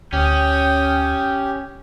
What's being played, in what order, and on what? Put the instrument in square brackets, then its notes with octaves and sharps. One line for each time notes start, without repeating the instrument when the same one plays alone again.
[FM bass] D2 [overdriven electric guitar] C#4 [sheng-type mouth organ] G4 [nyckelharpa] G5 D#6